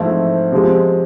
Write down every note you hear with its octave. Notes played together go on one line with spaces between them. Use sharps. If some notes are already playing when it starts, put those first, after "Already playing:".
Already playing: G#2 F3 A3 C4 E4
C3 F3 G#3